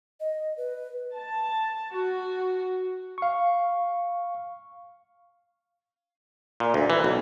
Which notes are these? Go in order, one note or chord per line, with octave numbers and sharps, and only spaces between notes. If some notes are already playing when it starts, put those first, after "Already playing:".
D#5
B4
A5
F#4
F5 C#6
A#2
D2
E3
B1